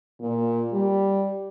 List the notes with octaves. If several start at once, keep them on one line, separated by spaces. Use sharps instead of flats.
A#2
G3